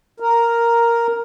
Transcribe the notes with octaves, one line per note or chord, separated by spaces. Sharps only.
A#4